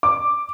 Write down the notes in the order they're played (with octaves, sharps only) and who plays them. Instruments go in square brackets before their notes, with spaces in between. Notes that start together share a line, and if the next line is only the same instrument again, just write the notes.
[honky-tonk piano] D6